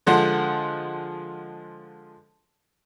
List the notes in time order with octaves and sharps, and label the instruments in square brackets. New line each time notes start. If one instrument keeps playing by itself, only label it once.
[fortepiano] D3 F3 G#3 F#5 C6